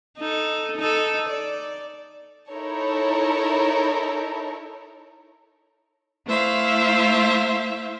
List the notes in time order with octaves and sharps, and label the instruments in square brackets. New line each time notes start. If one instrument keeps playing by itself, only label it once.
[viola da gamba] D#4 A4
D#4 A4
D5
[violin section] D#4 E4 A4 A#4 C#5
[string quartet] A3 E4 C5 E5 F5